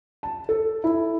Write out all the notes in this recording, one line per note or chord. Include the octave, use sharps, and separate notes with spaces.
A5
A4
E4